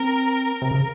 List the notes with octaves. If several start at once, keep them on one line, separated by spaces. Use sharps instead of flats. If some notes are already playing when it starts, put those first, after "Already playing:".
Already playing: C4 A#4
C3
C#3